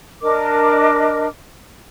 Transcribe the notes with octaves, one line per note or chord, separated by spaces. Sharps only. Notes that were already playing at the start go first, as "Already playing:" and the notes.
D4 A#4 D#5 D6